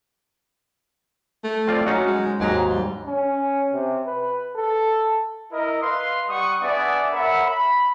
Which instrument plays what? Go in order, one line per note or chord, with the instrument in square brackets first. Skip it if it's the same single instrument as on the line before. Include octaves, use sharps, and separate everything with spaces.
[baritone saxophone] A3
[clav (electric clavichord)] C4 F4 D5
[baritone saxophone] F#3 [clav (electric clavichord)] C#4 D#4 F#4
[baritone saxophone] G#3
[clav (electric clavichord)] D#2 G#2 A#5 [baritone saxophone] F#3
[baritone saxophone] G3
[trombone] C#4
C3
B4
A4
[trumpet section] E4 A#4 D#5
B4 D#5 F5 C6
G3 F#5 C#6 D#6
B3 D4 G#4 D5 E5 G#5
A#4 C#5 E5 F#5 B5
B5